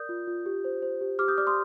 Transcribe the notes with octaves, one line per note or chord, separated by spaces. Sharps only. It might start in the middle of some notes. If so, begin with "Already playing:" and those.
Already playing: A#4 D5 D#6 G6
F4
F4
G4
C5
C5
G4
G4 D6 F6
D#6 G6
D5 D6 F6
C6 D#6